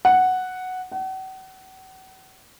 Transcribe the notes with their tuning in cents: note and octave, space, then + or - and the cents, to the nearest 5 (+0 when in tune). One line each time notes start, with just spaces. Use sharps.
F#5 +0
F#5 +40